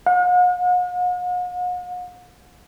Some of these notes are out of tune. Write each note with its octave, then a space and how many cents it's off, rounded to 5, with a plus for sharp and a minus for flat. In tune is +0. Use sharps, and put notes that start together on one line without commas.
F#5 -45